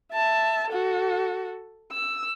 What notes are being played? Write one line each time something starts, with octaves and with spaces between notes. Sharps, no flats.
E5 A5
F#4 A4
E6